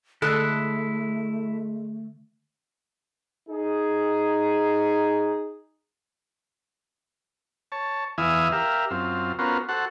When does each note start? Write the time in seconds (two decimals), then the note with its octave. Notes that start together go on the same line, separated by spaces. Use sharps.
0.22 D3 G#3 A3 E4 A4 F#6
3.50 D#4 G#4
7.72 C#5 A5
8.18 E2 E3 E5 F5 G#5 D#6
8.52 G4 A#4 E5 F5
8.91 F#2 C4 F4
9.39 B3 C#4 F4 F#4 A#4 C5
9.69 F#4 A4 C5 F#5